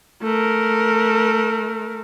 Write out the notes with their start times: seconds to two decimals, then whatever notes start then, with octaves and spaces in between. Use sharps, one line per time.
0.23 A3 A#4